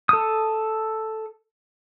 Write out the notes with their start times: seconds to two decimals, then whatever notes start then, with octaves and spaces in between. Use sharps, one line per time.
0.09 A4 D#6